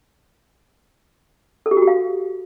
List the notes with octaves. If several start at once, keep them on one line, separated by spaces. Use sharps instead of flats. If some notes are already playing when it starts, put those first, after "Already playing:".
A4
G4
F#4
G4
F5